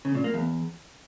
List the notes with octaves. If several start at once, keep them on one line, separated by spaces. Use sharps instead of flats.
C#3
A#2
A#3
E2